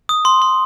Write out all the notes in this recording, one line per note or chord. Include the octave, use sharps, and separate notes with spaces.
D#6
C6
C6